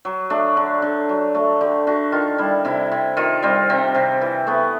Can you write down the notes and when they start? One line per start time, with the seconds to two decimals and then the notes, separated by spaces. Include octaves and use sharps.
0.05 F#3
0.30 A3 D4
0.57 D3
0.82 D3
1.09 F#3
1.35 A3
1.61 D3 G4
1.87 D3 F#4
2.12 D#3 F4
2.38 G3 E4
2.65 C3 E4
2.92 C3
3.17 D#3 F4
3.42 G3 C4
3.70 C3 C4
3.95 C3
4.21 E3
4.47 A3 B3